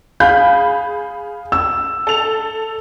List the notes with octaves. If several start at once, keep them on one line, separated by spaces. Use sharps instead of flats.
G#4 F5 B5 G6
E6
A4 F7